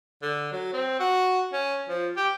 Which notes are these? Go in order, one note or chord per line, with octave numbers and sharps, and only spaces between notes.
D3
F#3
C4
F#4
C#4
F3
G4